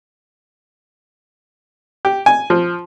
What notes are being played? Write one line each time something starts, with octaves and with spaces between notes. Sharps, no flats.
G4
G#5
F3